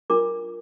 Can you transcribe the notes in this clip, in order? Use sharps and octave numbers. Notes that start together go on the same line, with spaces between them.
D4 F4 A#4 D6